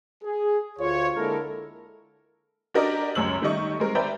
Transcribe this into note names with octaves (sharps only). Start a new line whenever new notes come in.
G#4
D2 F4 C#5
D3 G#3 A#3 E4 A4 A#4
D4 F#4 G4 A#4 D5 D#5
C#2 F#2 C#5 E6 F#7
D#3 G3 A3 D#5 C#6
G3 G#3 C4 A#4
B4 C5 D5 E5 G5 A#5